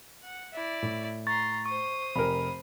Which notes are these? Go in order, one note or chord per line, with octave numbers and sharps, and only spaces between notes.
F#5
E4 D5
A2
A#5 C6 C#6 A6
C5 C#6 D#6
F1 A#4 B5